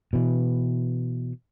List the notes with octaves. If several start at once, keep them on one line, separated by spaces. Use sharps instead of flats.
B2 E3